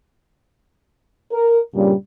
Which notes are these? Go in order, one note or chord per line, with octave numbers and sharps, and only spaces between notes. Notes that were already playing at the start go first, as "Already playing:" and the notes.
A#4
G2 A#2 C#3 G3